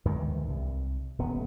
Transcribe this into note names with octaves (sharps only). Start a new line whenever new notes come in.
D2 G#2 D#3 E3
C2
D#1 D2 B3